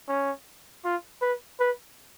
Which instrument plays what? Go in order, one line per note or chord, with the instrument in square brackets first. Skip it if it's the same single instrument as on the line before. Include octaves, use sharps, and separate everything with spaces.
[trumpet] C#4
F4
B4
B4